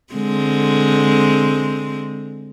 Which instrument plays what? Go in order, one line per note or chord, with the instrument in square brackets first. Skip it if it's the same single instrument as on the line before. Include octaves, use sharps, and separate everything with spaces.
[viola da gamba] D3 G#3 C4